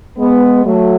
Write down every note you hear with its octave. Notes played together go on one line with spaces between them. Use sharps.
G#3 B3
F#3 A3